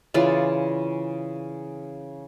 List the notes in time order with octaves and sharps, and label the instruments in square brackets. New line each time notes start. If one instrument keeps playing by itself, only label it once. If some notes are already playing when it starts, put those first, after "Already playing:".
[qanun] C#3 E3 F4 D5